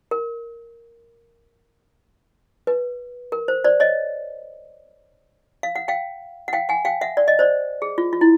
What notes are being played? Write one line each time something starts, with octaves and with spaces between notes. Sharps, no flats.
A#4
B4
A#4
C5
C5 D5
C#5 D#5
F5
F#5
F5 G5
F#5
F5 G5
F#5 G#5
F5 G5
E5 F#5
D5
D#5
C5 D5
G#4
F4
F4
E4